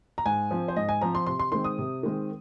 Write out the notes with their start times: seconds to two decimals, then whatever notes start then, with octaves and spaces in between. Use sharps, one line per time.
0.18 A#5
0.26 G#2 G#5
0.51 F3 C4
0.68 C5
0.76 G#2 D#5
0.89 G#5
1.01 F3 C4 A#5
1.15 C6
1.27 C3 C6
1.39 C6
1.52 D#3 G#3 C4 C6
1.64 D#6
1.78 C3
2.03 D#3 G#3 C4